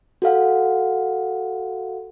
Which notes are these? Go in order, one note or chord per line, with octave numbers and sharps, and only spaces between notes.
F#4 A4 F5 F#5